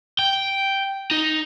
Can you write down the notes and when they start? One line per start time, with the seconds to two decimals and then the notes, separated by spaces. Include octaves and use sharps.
0.19 G5
1.11 D#4